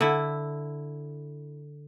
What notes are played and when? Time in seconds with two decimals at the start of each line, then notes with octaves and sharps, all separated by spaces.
0.01 D3 E4